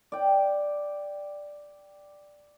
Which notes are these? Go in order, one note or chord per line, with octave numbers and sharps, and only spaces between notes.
D5 G5